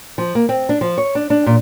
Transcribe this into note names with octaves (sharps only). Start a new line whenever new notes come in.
F3
A#3
C4
D4
F3
C#5
D4
D4
A#2